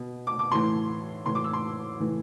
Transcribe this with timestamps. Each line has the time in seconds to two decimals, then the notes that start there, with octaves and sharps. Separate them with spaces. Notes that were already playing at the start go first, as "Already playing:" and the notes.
Already playing: B2
0.27 D6
0.39 D6
0.51 A2 E3 C6
1.26 A2 E3 C6
1.35 D6
1.44 E6
1.53 C6
2.00 A2 E3